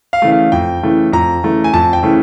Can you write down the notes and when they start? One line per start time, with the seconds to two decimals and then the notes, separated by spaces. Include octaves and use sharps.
0.13 F5
0.22 C#3 E3 A3
0.32 F5
0.52 F2 G5
0.83 C#3 E3 A3
1.13 F2 A#5
1.43 C#3 E3 A3
1.64 G#5
1.74 F2 A5
1.93 G5
2.03 C#3 E3 A3